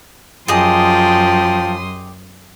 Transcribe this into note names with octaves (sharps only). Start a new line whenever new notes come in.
F#2 F3 G4 G#4 D#5 G5 C6 D#6